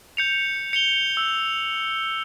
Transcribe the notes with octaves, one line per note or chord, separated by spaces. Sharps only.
G6 C#7 F7
C#7 F7 G7
E6